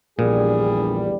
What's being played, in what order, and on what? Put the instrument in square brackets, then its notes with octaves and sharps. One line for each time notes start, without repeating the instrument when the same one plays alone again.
[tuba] A#1 [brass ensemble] E2 D3 G3 [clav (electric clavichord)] A#2 [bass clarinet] G#4